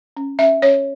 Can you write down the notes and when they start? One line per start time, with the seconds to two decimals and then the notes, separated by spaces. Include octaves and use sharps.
0.17 C#4
0.39 C#4 E5
0.62 C#4 C#5